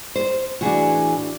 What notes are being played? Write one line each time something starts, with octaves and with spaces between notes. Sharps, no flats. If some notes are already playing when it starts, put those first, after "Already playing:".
C5
A2 E3 D4 F#4 G#4